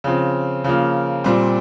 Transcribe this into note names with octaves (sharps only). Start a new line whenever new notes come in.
C#3 F3 C4
C#3 F3 A#3
A#2 G3 C4